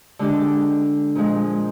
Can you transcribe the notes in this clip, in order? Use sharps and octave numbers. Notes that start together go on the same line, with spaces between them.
D3 G#3 D4 G4
A#2 F3 G#3